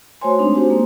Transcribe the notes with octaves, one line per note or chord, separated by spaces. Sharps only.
A3 F#4 C5 C#5 G#5 C6
G#3 A3 C4 D4 D#4
F#4 G4 C5
A#3